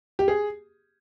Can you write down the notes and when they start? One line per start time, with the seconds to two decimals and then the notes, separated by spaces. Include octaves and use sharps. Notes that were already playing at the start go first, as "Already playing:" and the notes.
0.19 G4
0.28 G#4